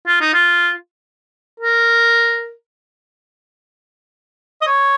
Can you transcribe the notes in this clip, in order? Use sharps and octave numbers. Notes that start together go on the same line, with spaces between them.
F4
D#4
F4
A#4
D#5
C#5